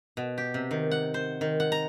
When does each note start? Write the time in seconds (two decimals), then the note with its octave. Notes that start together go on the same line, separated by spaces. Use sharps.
0.17 B2
0.38 G4
0.54 C3
0.71 D#3
0.91 F#5
1.14 C5
1.41 D#3
1.60 F#5
1.72 A#5